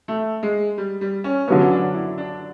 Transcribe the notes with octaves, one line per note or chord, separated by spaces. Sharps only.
A3
G#3
G3
G3
C#4
D3 F#3 B3 C#4
C#4
D4
E4
D4